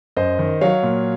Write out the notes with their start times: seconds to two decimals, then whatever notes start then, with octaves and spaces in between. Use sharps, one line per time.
0.17 F#2 C5 D#5
0.39 D#3
0.61 F#3 C#5 F5
0.83 A#2